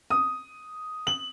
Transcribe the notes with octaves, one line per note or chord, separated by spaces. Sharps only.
D#6
F#7